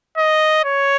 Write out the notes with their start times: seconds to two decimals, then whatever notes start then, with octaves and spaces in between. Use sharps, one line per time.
0.18 D#5
0.65 C#5